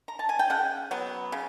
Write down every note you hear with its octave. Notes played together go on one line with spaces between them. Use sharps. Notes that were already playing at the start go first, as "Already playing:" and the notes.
A#5
A5
G#5
G5
C#3 F#5
F#3 B3
C#3